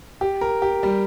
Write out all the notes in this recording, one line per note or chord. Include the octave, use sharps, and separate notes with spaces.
G4
A#4
G4
G3